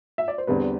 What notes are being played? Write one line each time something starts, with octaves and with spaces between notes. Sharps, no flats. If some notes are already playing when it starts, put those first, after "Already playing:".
E5
D5
C5
E2 D3 G3 C4 B4